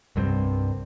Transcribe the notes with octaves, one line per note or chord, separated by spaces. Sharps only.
C2 G2 G#3 C4